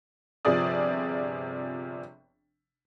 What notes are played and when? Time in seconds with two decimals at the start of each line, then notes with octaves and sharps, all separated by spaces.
0.45 G1 C3 F3 G#4 D5 D#6